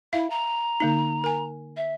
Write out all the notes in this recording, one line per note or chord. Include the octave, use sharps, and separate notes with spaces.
E4 E5 F5
A#5
D3 A#3 D#4
A#4 G#5
E5